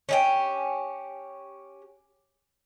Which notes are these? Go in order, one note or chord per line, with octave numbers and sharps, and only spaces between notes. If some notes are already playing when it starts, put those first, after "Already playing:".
C#4 D#4 G4